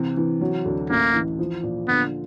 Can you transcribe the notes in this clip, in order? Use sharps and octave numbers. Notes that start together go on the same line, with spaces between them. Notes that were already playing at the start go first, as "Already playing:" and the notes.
Already playing: C3 E3
E3
F#3
D2
A1 A#3
E3
F3
A#2
D3 B3